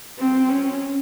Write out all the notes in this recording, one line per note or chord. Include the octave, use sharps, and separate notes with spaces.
C4
C#4